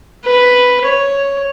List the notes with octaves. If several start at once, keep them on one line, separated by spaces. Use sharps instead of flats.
B4
C#5